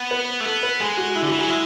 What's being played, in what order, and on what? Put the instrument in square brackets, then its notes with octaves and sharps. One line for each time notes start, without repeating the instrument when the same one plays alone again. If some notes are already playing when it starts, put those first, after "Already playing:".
Already playing: [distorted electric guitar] B3
[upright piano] B4
[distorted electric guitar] A3
[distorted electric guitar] B3 [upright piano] A4
[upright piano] B4
[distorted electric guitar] G#3 [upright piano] G#4
[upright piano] F#4
E4
[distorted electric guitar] D3
[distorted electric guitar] E3 [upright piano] F#4
[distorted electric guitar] F#3 [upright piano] G#4
[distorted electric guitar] G#3 [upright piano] E4